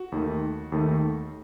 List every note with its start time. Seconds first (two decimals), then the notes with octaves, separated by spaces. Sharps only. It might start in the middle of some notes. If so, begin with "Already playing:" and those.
Already playing: F#4
0.12 D#2 D#3 A3
0.72 D#2 D#3 A3